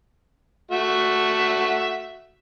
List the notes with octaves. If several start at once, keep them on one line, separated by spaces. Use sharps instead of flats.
A3 F#4 E5